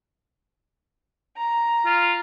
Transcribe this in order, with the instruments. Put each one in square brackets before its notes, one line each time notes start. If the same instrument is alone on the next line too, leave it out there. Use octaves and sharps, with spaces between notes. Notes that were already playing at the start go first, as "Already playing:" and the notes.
[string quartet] A#5
[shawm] F4